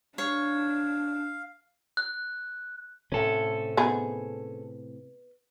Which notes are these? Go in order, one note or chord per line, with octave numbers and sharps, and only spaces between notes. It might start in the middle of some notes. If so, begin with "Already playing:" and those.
D4 C#5 F5
F#6
A2 C3 C#4 A4
B3 D#4 G#4